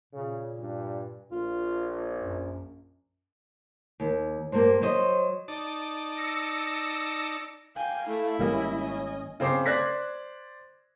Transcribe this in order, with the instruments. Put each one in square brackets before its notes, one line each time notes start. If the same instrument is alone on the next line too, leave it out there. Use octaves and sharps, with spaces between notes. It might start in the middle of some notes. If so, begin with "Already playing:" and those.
[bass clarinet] A#2 [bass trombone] C#3
[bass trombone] G2
[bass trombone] A#1 [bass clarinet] F4
[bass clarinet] F#2
[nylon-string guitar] D#2
[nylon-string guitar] G2 A#3 [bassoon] C5
[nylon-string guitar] F#3 D#5 [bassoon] C5
[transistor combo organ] D#4 D5 A5
[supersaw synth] E6 A#6 C#7
[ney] F5 [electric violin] G5 G#5
[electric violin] A3 [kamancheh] E4
[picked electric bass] G#1 G3 A#3 [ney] C#4 [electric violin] D#5 G#5
[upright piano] C#3 C4 C5 D6 C7
C5 D5 F#6 G#6 A#6 B6